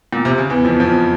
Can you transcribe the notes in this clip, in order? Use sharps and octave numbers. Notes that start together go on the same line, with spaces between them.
A#2
C3
C#3
E2 E3
F2 F3
F2 F3